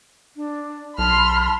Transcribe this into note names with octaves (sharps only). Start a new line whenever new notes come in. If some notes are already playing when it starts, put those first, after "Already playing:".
D4
B1 A5 B5 C6 F6